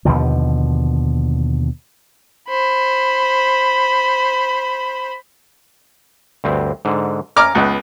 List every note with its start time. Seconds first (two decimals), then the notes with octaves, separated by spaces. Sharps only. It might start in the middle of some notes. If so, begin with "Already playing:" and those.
0.05 D#2 B2 D3 F3
2.49 C5 B5
6.44 D2 G2 C4
6.85 G#2 D3
7.36 C#4 A#5 D6 F6
7.55 C#2 B3 F#5